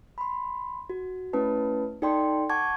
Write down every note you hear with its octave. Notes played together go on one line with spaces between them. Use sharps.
B5 C6
F#4
A3 C#4 E4 B4 A5
D#4 A4 D5 G5 A5 C6
F#5 A5 C#6 D6 G#6